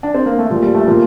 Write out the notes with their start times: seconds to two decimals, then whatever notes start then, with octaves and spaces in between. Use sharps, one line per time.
0.03 D4
0.14 C4
0.26 A#3
0.39 A3
0.50 A#2 F3 G3
0.63 G3
0.74 A3
0.87 A#2 F3 A#3